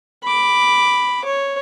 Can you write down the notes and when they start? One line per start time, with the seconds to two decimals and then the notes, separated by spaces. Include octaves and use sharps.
0.23 B5 D6
1.25 C#5